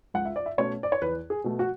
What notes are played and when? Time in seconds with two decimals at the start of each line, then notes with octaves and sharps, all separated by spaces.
0.14 C#2 F#5
0.25 E5
0.36 D5
0.46 E5
0.58 B2 A3 C#4 C#5
0.83 D5
0.92 C#5
1.02 E2 B4
1.30 G#4
1.44 B2 A3
1.59 F#4